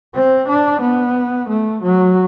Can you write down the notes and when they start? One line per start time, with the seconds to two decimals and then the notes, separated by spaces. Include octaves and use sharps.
0.15 C4
0.48 D4
0.82 B3
1.49 A3
1.83 F#3